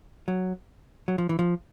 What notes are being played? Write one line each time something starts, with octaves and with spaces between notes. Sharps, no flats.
F#3
F#3
F3
E3
F3